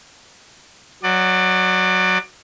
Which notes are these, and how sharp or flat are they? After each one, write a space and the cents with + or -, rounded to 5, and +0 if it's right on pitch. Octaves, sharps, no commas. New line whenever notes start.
F#3 +0 D5 +25